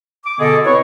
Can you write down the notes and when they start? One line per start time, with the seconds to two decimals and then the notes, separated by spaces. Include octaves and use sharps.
0.25 D6
0.39 B2 D3 B3 G#4 A4 D#5
0.65 C4 E4 B4 C#5